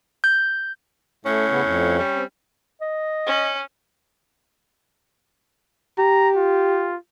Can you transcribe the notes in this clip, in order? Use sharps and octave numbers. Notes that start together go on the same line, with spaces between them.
G6
A2 A3 C#4
C#3 B3
F2
G3
C4
D#5
C#4
G4 A#5
F4